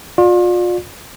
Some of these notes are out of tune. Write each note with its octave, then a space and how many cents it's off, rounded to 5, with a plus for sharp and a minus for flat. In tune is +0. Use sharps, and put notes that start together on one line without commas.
F4 +35 D5 +25